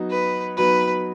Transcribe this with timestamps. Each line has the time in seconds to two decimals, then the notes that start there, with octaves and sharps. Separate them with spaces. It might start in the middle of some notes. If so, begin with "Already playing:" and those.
Already playing: F#3 B3 D#4 F#4
0.10 B4
0.57 F#3 B3 D#4 F#4 B4